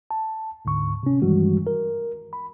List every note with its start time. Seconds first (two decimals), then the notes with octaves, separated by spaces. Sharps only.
0.11 A5
0.65 D2 G#2 D3 C#6
1.03 C3 C#4
1.22 G2 D#3 E3 G3 G#3 F#4
1.67 A#4
2.33 B5